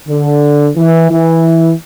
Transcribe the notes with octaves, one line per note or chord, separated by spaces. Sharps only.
D3
E3
E3